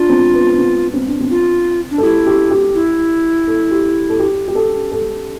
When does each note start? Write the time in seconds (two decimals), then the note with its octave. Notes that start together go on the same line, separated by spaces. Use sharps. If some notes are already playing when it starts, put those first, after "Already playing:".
Already playing: D4 F4
0.09 C4
0.34 B3
0.58 C4
0.94 C4
1.07 D4
1.21 C4
1.30 F4
1.91 D4
1.98 A4
2.02 E4 G4
2.27 G4
2.51 G4
2.75 E4
3.47 A4
3.71 G4
4.09 A4
4.19 G4
4.48 G4
4.55 A4
4.92 A4